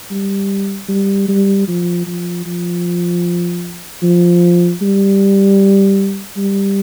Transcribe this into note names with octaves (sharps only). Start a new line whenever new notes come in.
G3
G3
G3
F3
F3
F3
F3
G3
G3